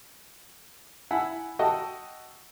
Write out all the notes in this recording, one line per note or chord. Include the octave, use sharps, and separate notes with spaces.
E4 F#5 G#5 B5
F#4 A4 D#5 G5